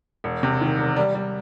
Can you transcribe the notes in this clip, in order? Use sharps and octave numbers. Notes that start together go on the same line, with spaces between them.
E1
C3
D#3
E1
G3
G3